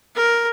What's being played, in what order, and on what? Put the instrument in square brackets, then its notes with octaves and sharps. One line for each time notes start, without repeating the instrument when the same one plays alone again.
[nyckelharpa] A#4